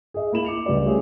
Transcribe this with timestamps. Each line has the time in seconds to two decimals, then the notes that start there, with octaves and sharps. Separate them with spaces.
0.14 G#4 D#5 E5
0.32 A#3 E4 B5 E7 F#7
0.45 D6 C#7 F7
0.66 C#2 G3 B4 D5
0.86 G3 A3 C#4 G4 G#4 E5